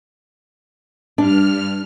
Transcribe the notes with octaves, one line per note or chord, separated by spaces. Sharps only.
G2 D4 F6